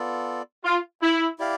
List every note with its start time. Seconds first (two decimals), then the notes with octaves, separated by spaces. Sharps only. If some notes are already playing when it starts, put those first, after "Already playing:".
Already playing: B3 F4 A4 D5
0.65 F4
1.02 E4
1.39 E4 G4 D5 F5